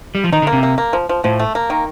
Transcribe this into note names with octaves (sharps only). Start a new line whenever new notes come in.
G3
F3
D#3 D#4
D3
A#3
C3
A#3
A#3
F3
F3
A2 F3
A3
A#3
D#3